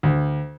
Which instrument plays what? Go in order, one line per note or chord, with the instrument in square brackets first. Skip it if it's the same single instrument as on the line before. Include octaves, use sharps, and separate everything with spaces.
[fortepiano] D2